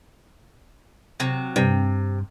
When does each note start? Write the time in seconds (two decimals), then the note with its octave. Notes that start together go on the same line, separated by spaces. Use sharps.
1.20 C3 F#3
1.56 G2 C3